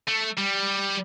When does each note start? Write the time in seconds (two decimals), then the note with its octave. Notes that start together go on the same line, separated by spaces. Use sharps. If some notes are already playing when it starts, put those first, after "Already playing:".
0.08 A3
0.37 G3